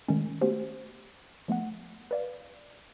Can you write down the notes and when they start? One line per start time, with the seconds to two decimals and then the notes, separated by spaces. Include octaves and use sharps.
0.08 D#3 G#3 A3 C#4
0.41 A3 B3 C#4 F#4 G4 C5
1.48 F3 A3 B3 F#5
2.11 B4 D5 F5